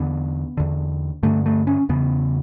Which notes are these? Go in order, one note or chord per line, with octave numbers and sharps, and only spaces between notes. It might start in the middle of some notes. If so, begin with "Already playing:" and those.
Already playing: E2 D3 B3
E2 D3
G2 D3 A3
A3
C#4
E2 C#3 B3